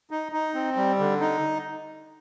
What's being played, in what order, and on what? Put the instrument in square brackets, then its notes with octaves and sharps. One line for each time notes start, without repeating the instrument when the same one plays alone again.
[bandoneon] D#4
D#4
C4
G3
D3
D#4